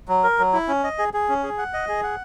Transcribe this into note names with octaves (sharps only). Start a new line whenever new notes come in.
F#3
A#4
F#3
E4
C#4
D#5
G#4
G#4
C#4
G#4
F#5
D#5
G#4
F#5